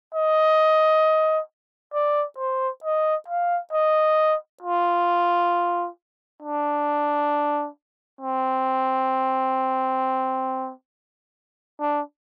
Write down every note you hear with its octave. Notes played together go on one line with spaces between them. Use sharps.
D#5
D5
C5
D#5
F5
D#5
F4
D4
C4
D4